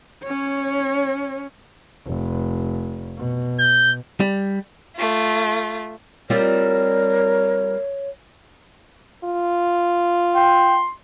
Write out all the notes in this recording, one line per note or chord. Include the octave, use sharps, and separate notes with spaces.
C#4 C#5
F1
B2
G6
G3
A3 F4
G3 C4 F4 A#4 C#5
F4
G5 C6